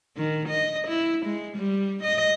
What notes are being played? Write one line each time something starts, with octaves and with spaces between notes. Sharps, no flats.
D#3
D#5
E4
G#3
G3
D#5